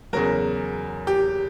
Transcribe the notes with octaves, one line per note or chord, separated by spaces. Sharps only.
E2 C#3 F#3 A#4
G4